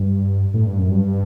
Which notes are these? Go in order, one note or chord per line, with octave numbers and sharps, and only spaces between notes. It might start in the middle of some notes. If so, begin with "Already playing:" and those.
Already playing: G2
A2
G2
F#2
G2